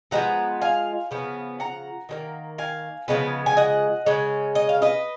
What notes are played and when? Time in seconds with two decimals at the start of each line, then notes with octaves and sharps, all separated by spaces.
0.11 F3 G#3 B3 F#5 A#5
0.61 F5 G#5
1.11 C#3 F3 B3
1.60 F#5 A#5
2.09 D#3 F#3 A#3
2.58 F5 G#5
3.08 C#3 F3 G#3 B3
3.46 G#5
3.57 D#5 F#5
4.06 C#3 G#3 C#4
4.55 D#5
4.69 F5
4.82 B4 D#5